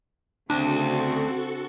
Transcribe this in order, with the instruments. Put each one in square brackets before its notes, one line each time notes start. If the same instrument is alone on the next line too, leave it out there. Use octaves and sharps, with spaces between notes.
[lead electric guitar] D2 [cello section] C#3 C4 [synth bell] D4 [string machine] F#4 A4 C#6